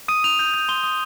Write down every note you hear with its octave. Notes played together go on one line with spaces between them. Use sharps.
D#6 D#7
D#6 F7
G6
G6
C6 G7
D#6